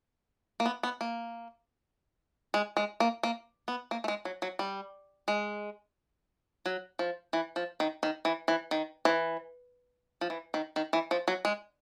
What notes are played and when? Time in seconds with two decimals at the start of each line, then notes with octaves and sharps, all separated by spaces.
0.60 A#3
0.66 B3
0.83 B3
1.01 A#3
2.54 G#3
2.77 G#3
3.00 A#3
3.23 A#3
3.68 B3
3.91 A#3
4.04 A3
4.08 G#3
4.25 F#3
4.42 F#3
4.59 G3
5.28 G#3
6.66 F#3
6.99 F3
7.33 E3
7.56 F3
7.80 D#3
8.03 D#3
8.25 E3
8.48 E3
8.71 D#3
9.05 E3
10.21 F3
10.30 E3
10.54 D#3
10.76 D#3
10.93 E3
11.11 F3
11.28 F#3
11.45 G#3